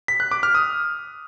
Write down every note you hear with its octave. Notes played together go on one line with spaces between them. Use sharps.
B6
F#6
D6
F6
D#6